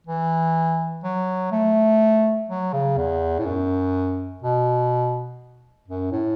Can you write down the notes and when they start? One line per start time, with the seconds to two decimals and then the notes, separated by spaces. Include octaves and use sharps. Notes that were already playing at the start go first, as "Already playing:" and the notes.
0.07 E3
1.03 F#3
1.51 A3
2.49 F#3
2.73 C#3
2.97 E2
3.39 A2
3.45 F#2
4.42 B2
5.88 F#2
6.12 A2